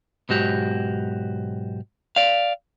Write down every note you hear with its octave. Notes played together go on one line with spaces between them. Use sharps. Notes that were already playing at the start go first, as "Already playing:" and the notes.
B1 G#2 F#4 G4
D5 F5